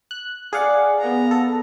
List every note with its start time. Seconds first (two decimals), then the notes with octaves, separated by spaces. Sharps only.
0.11 F#6
0.53 G#4 D5 F5 F#5
1.00 B3 A#5
1.31 A4